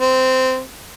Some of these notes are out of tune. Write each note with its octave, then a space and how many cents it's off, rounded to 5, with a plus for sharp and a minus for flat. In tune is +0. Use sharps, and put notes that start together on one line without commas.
C4 -15